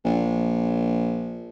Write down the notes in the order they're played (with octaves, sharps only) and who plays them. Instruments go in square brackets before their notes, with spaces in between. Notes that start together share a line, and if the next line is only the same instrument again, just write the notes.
[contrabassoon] A#1